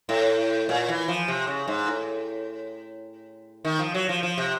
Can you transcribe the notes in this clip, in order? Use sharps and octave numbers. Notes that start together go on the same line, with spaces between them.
A2
A#2
E3
F3
C3
C#3
G#2
A2
D#3
F3
F#3
F3
F3
C3